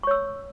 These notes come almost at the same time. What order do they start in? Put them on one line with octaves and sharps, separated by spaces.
C#6 C#5 E6